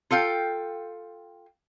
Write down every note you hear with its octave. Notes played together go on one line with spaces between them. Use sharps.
F4 A4 F5 G5